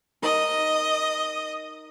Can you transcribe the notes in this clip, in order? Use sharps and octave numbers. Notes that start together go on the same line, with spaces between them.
D#4 A#4 D#5